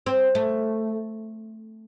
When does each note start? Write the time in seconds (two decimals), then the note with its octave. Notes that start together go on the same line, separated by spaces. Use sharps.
0.06 C4
0.35 A3